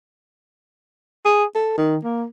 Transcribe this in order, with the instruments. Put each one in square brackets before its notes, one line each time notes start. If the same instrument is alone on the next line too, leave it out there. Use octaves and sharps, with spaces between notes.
[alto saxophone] G#4
A4
D#3
A#3